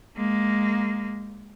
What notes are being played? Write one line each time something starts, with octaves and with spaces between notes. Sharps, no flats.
G#3 A#3